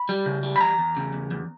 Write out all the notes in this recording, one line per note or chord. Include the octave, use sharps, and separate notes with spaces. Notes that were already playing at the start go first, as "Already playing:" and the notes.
Already playing: B5
G3
C#3
G3
B5
E2 A#5
E2
C#3
E2
E2